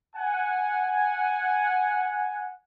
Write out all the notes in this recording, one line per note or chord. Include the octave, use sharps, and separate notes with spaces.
F#5 G#5